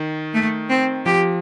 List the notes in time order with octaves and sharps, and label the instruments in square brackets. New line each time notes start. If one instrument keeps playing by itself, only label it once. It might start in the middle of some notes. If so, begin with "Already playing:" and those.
Already playing: [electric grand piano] D#3
[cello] A3
C4
[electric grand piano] F3 [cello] G4